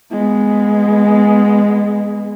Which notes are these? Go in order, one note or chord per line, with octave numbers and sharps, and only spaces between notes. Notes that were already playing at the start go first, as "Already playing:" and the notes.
G#3 B3